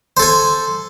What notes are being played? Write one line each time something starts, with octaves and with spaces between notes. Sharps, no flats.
A4 C5 G#5